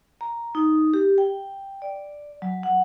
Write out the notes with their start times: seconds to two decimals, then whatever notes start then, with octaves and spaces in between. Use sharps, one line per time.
0.21 A#5
0.55 D#4
0.94 G4
1.18 G5
1.82 D5
2.42 F#3
2.63 F#5